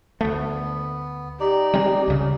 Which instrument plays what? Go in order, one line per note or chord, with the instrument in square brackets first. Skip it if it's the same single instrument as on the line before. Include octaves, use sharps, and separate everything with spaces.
[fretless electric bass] D2 A3 [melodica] B3
[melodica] D#4 D5 [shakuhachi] G4
[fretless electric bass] G3 G#3 C4
C#2 C#3